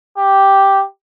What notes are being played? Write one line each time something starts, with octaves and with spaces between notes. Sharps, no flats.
G4